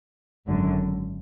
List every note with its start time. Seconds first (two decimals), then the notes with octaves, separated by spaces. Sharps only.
0.47 G#1 F#2 D3 F#3